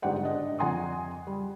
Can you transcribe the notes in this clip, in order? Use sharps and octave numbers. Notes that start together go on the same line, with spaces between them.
G1 G#2 G4 D5 F#5 G5
D4 D#5
F2 F#5 G#5 C6 D#6
G3